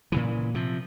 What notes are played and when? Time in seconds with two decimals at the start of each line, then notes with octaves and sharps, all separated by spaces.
0.12 A#2 C#3 E3
0.55 C3 F3